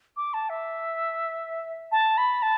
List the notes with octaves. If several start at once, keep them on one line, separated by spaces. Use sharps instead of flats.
D6
A5
E5
A5
B5
A5